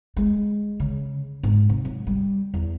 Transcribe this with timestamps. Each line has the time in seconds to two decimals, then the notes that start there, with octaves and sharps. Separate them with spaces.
0.17 G#3
0.80 C#3
1.43 G#2
1.69 C3
1.85 F#3
2.07 G3
2.54 E2